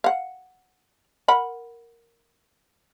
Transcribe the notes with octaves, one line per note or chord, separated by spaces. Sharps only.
F5 F#5
A#4 F#5 B5